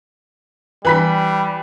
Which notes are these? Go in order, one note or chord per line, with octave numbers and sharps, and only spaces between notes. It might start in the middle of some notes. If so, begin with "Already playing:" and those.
E3 G3 B5 B6